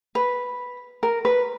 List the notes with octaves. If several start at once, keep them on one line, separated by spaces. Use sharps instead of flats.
B4
A#4
B4